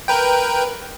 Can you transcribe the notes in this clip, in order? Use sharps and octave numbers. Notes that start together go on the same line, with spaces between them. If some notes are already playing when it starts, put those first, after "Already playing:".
A#4 B4 G5